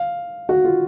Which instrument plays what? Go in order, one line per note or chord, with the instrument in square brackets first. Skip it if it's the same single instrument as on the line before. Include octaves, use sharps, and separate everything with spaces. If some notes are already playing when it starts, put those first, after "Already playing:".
Already playing: [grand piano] F5
F#4
F4